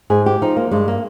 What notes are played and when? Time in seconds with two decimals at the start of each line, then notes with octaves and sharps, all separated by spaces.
0.10 G#2 G#4
0.26 G4
0.42 F3 D#4
0.57 A#3
0.71 G2 G#3
0.88 A#3